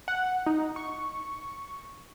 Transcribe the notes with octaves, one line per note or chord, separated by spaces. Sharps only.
F#5
D#4
C#6